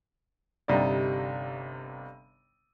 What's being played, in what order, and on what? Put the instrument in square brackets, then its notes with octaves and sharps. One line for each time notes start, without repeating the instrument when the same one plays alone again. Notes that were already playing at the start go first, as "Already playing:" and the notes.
[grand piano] G1 C3 G3 D#4 D5